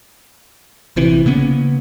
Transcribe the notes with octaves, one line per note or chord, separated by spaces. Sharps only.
A#1 C3 E3
C#3 A#3 B3 C#4